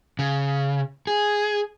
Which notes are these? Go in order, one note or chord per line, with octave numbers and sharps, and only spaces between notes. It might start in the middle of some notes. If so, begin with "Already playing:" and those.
C#3
G#4